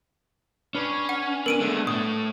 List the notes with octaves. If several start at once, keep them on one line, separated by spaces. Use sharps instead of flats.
C#4 D4 B4
F#5
B3 D4 A#4 D7 D#7
G#3 A3
A2 A3 D#6